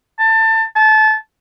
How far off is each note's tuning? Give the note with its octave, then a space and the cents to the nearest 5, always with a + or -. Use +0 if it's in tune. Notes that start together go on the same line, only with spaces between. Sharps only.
A5 +25
A5 -25